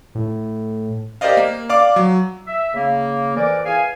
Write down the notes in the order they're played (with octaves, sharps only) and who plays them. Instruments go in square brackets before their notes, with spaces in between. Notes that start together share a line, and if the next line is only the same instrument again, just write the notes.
[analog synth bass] A2
[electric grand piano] G4 A#4 C5 D5 D#5 F5
A#3
D5 F5 D6
F#3
[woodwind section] E5
C#3 A#3
F2 E3 A#4 D5
E2 G#4 F5 G#5